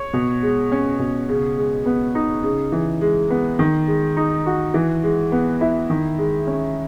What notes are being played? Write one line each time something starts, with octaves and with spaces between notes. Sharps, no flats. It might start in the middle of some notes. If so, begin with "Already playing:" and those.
Already playing: C#5
B2
G#3
C#4
B2
C#3
G#3
B3
D#4
C#3
E3
G#3
B3
D#3
G#3
D#4
F#4
E3
G#3
B3
E4
D#3
G#3
C#4